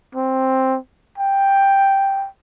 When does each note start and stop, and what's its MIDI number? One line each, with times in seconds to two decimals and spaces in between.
0.15 0.78 60
1.18 2.27 79